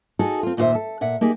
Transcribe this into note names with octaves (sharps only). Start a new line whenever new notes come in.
D#4 F#4 G#4 A4
C4 F4
D#2 A#2 D#4 F#4 C5 E5
A4
A#2 E5 F#5
A#3 D#4 G4 G#4